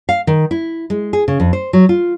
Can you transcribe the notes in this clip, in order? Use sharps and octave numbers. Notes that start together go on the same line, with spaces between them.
F5
D#3
E4
G#3
G#4
C#3
F2
C5
F#3
F4